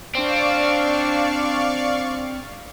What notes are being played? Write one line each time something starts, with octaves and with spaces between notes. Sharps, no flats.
C4 D4 D5 F5 C#6